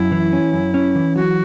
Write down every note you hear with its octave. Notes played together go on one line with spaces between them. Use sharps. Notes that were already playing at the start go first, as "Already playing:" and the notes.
Already playing: F#2 E4
E3
C#4
F#2
C#4
E3
F#3 F#4